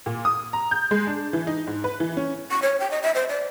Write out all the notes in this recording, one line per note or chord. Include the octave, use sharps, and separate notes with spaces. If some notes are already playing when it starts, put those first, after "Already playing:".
A#2
D#6
A#5
G6
G#3
D4
E3
D#4
G#2
B4
E3
C#4
C#6
C#5
G5
D#5
E5
C5
D5